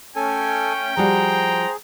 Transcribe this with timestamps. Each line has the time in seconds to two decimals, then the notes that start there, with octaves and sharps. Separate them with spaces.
0.16 A3 C#4 A4 G5 G#5
0.97 F3 G3 F#4 G#4 C5 A#5